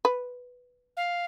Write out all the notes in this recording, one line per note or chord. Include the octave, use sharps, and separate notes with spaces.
B4
F5